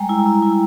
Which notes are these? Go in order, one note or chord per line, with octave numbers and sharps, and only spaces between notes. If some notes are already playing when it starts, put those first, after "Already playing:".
Already playing: G3 G#3 G5 A#5
E4
E4
E4